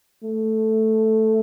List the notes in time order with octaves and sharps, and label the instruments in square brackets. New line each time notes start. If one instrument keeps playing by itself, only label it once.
[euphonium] A3